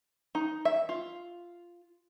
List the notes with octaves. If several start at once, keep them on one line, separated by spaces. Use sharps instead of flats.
D#4
E5
F4